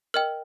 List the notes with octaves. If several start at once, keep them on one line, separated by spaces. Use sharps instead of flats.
A#4 D#5 G5 F6